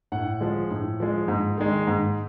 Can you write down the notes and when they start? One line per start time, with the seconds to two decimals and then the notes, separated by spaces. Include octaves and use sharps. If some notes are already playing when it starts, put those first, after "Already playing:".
0.12 A2 F#5
0.41 F3 G#3
0.71 A2
1.00 F3 G#3
1.28 G#2
1.58 D#3 G#3
1.87 G#2